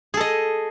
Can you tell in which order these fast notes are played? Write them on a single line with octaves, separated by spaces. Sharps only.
G#4 A4 D#5